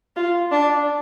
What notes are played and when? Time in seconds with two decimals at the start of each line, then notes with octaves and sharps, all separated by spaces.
0.16 F4
0.52 D4